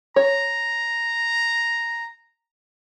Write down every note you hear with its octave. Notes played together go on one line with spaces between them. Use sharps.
C#5 A#5